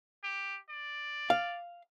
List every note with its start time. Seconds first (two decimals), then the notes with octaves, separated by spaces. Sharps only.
0.24 G4
0.69 D5
1.30 F5